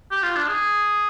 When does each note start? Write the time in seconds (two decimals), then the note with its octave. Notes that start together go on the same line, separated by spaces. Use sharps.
0.11 G4
0.23 F4
0.36 D4
0.49 G#4